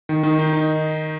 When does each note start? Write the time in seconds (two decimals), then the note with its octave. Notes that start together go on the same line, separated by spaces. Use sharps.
0.09 D#3
0.23 D#3
0.39 D#4
0.53 D#4